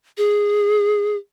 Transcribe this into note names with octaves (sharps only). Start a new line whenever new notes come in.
G#4